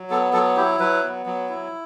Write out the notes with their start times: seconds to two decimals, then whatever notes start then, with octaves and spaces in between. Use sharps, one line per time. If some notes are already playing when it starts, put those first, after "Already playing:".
Already playing: F#3
0.10 B3 A4
0.33 F#3 A4
0.57 E4 G4
0.80 F#3 B4
1.03 B3
1.26 F#3
1.49 E4